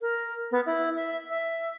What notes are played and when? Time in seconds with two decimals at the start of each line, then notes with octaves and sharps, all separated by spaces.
0.01 A#4
0.52 B3
0.66 E4
0.96 E5
1.30 E5